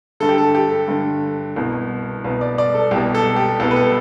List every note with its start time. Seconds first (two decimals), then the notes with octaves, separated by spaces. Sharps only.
0.20 G2 D3 A4
0.29 G4
0.38 A4
0.55 G4
0.71 A4
0.88 G2 D3
1.56 C2 B2
2.24 C2 B2 B4
2.41 D5
2.58 D5
2.75 A4
2.91 C2 B2 G4
3.15 A4
3.36 G4
3.60 C2 B2 A4
3.71 B4
3.76 A4